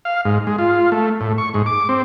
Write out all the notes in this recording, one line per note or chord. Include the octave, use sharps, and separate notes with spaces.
F5
G#2
G#3
F4
A3
A2
C#6
G#2
D6
C4